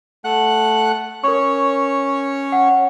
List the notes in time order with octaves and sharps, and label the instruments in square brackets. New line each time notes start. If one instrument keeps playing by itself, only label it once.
[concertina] A3 F#5 F#6
[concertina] C#4 C#5 [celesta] A#4 C#6
[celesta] F#5